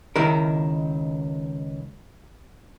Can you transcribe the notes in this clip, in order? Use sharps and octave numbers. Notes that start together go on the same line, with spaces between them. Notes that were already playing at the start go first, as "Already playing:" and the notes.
C#2 D#3 E4 A#4